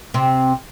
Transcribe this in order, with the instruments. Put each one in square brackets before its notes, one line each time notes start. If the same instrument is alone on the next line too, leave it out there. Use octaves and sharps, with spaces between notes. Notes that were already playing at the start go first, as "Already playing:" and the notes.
[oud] C3 C4